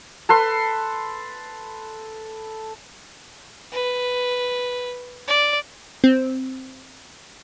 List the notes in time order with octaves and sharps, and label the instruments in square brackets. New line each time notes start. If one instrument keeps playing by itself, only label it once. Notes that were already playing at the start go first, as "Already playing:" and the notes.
[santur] A4 B4 C6
[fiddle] B4
D5
[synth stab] C4